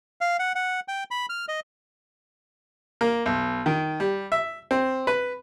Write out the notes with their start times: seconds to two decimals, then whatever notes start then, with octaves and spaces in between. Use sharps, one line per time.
0.21 F5
0.39 F#5
0.55 F#5
0.88 G5
1.11 B5
1.29 F6
1.48 D#5
3.01 A#3
3.26 B1
3.66 D#3
4.00 G3
4.32 E5
4.71 C4
5.07 B4